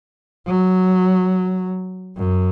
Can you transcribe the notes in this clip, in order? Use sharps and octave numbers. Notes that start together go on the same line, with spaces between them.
F#3
F#2